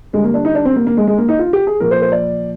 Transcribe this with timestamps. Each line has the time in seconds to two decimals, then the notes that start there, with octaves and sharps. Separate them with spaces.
0.13 D3 G3 G#3
0.24 A#3
0.34 D4
0.45 D#4
0.55 D4
0.65 C4
0.76 A#3
0.87 A#3
0.97 G#3
1.08 G#3
1.18 A#3
1.29 D#4
1.39 F4
1.53 G4
1.67 G#4
1.80 A#2 F3 A#4
1.91 C5
2.02 C5
2.12 D5